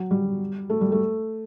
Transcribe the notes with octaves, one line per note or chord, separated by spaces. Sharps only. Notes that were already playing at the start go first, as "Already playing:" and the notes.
Already playing: F#3
G3
A3
G3
A3